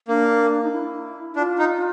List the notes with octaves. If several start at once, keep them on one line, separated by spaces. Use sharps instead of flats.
A#3 D4
D#4
E4
D4 F4
D#4